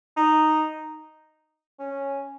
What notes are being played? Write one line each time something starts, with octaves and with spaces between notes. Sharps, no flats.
D#4
C#4